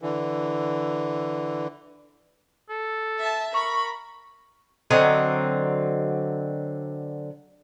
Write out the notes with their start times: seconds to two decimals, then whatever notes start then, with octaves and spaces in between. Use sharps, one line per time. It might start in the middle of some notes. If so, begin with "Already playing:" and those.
0.01 D3 E3
2.69 A4
3.19 E5 A5
3.54 A#4 B5 C#6
4.90 D3 F#3 C4 D#5